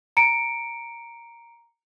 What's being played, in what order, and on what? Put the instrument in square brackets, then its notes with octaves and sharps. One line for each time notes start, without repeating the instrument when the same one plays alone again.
[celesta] A#5 C#7 D7